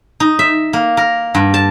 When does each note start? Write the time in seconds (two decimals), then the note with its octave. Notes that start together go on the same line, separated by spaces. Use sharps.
0.20 D#4
0.39 E5
0.73 A#3
0.97 A#4
1.35 G2
1.54 A5